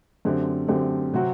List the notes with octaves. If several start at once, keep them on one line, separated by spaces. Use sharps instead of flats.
F#2 D3 A3 C4 G4
F#2 D3 A3 C4 G4
C3 F#3 C4 F#4